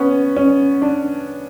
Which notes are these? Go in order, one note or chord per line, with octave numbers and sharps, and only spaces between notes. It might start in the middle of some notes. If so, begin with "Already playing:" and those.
Already playing: B3 C#4
C#4
D4